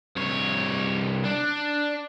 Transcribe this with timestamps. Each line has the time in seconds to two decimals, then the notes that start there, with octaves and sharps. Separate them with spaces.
0.16 C2 C#5
1.24 D4